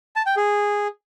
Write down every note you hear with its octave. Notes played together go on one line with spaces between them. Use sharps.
A5
G5
G#4